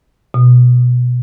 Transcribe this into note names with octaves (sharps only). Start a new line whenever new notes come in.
B2